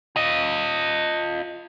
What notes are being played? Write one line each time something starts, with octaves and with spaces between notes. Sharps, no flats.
F4 D#5